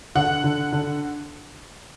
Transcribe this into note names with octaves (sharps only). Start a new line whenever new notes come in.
D3 F#5
D3
D3